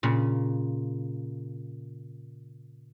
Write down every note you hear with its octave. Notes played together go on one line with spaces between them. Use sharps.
A#2 C#3